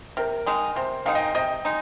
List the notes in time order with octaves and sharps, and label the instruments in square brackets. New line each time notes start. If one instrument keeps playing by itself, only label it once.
[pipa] C3 [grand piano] A#4
[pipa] D#3 G#3 D#4
[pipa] C3 [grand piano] C5
[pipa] D#3 G#3 D#4 [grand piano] F5
[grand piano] D#5 G5
[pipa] C3 [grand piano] D#5 G5
[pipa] G#3 D#4